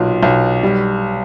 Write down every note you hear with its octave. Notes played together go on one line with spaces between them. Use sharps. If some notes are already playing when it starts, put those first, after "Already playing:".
Already playing: B1 A#2
B1
G3